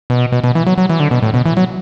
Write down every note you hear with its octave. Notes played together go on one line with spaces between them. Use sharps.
B2
B2
B2
E3
F#3
F#3
E3
D3
B2
A2
B2
E3
F#3